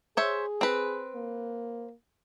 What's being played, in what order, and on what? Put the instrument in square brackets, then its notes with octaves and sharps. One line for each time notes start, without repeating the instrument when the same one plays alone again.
[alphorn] G#4 [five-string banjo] C5 C#5 E5
[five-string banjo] C4 B4
[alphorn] A#3